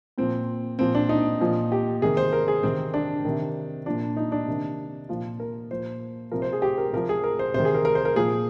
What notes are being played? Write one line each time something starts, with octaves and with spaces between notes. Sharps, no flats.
A#2 F3 C4
A#2 F3 C4
D4
D#4
A#2 F3
G4
C3 D#3 G#4
C5
A#4
G#4
C3 D#3 C4
D4
C3 D#3
A#2 F3 D4
D#4
D4
C3 D#3
A#2 F3 F4
A#4
A#2 F3 C5
C3 F3 A#4
C5
G#4
G4
A#4
C3 F3 A#4
G#4
A#4
C5
C3 D#3 C5
G#4
A#4
A#4
C5
A#4
A#2 F3 G#4